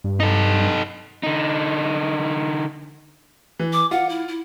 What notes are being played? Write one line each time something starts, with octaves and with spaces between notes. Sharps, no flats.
G2
D#4 A4
D3 D#4
E3
D6
F4 F#5
E4
E4